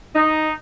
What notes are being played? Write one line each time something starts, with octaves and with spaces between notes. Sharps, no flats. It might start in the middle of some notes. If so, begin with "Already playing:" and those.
D#4